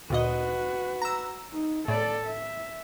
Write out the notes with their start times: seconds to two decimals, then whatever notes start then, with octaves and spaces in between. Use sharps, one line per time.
0.10 D2 A#2 F#4 B4 D#5
1.02 A#5 E6
1.52 D#4
1.88 A2 A4 D5
2.27 E5